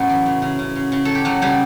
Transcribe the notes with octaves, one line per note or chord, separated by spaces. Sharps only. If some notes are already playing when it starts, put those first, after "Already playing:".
Already playing: A2 F#3 B3 C#4 E4 F#4
E3
C#3
C#3
C#3
C#3
C#3
F#3 A4
G4
C#3 F#3 F#4
C#3 G3 G4